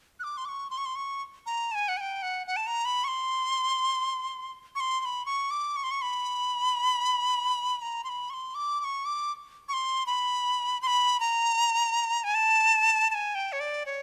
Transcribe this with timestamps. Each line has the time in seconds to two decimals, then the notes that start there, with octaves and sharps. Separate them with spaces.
0.20 F#6
0.24 D6
0.37 C6
0.45 D6
0.48 C#6
0.70 C6
0.78 C#6
0.85 C6
0.96 C#6
1.46 A#5
1.71 A5
1.75 G#5
1.88 F#5
1.97 G#5
2.01 G5
2.22 F#5
2.47 F#5
2.56 A5
2.67 A#5
2.85 B5
3.04 C#6
3.08 C6
4.75 C#6
4.80 C6
5.00 C6
5.05 B5
5.26 C#6
5.51 D6
5.76 C#6
5.84 C6
5.91 C#6
6.02 B5
7.79 B5
7.82 A#5
8.04 C6
8.09 B5
8.30 C#6
8.34 C6
8.55 D6
8.80 D6
8.84 C#6
9.05 D6
9.68 C#6
9.73 C6
10.06 B5
10.82 C6
10.87 B5
11.20 A#5
12.24 G#5
12.35 A5
13.10 A5
13.15 G#5
13.35 G5
13.52 C#5
13.60 D5
13.86 C#5